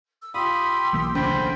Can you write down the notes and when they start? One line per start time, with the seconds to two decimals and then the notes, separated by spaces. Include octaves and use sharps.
0.22 E6
0.34 F4 G4 B5 C6 D#6 E6
0.93 B1 E3 A#3
1.15 D2 C#3 C5 G5 B5